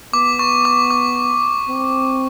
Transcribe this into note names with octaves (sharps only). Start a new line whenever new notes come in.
B3 D6
C#6
D6
D6
C4